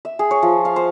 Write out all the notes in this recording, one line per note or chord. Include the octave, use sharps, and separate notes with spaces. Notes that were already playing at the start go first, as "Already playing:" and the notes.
E5
G#4
C#5
F3
F5
C5